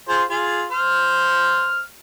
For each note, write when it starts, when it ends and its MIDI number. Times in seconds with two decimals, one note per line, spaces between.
0.09 0.23 65
0.09 0.23 68
0.09 0.23 72
0.30 0.65 65
0.30 0.65 68
0.72 1.80 72
0.72 1.80 89